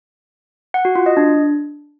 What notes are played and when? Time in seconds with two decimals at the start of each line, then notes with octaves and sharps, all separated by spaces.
0.74 F#5
0.85 F#4
0.95 F4
1.06 D#5
1.17 D4